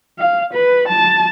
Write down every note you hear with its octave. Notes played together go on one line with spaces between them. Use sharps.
F5
B4
A5